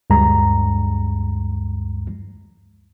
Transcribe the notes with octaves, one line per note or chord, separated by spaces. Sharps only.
D2 G2 G#3 A#5